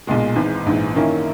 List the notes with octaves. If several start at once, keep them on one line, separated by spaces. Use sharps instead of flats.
B1 A#2 G#3
G#1 G#2 E3
A#1 G#2 E3
F#2 D#3 A#3 C#4 E4